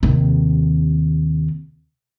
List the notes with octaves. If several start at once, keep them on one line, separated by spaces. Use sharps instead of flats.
D#2 C3